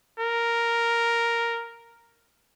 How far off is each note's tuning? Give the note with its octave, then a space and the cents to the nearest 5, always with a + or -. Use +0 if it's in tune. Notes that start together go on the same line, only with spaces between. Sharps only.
A#4 +0